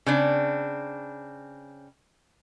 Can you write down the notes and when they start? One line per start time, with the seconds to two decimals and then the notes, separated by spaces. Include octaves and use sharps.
0.06 C#3 C4 D4